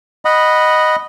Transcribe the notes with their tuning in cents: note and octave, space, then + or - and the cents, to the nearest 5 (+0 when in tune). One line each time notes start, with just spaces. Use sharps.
D#5 -5 F#5 +0 B5 -5